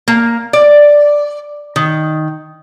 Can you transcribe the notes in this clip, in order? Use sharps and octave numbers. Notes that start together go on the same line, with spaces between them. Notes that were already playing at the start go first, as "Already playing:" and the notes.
A#3
D5
D#3